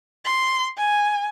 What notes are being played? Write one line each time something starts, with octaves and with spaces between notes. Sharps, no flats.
C6
G#5